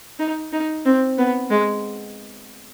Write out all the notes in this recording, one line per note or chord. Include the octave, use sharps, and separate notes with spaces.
D#4
D#4
C4
B3
G#3